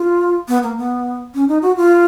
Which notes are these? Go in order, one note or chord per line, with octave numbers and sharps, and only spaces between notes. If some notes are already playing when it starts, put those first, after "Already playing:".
Already playing: F4
B3
A#3
B3
C#4
D#4
F#4
F4